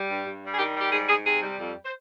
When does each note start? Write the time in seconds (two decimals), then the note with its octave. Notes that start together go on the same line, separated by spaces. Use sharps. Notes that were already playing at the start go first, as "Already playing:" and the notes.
Already playing: G3
0.08 G2
0.25 G2
0.42 G3
0.54 G#4
0.59 D#3 G4
0.75 G3
0.81 G4
0.92 G#2 G#4
1.09 G#2 G#4
1.25 C3 G#4
1.43 G3
1.59 F2
1.85 C5